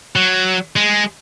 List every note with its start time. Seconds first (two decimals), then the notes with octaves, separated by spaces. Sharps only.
0.16 F#3
0.76 G#3